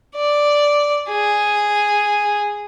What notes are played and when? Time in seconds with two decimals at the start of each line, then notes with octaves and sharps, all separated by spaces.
0.16 D5
1.10 G#4